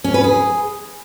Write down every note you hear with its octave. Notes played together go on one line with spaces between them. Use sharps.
C#4
B4
G#4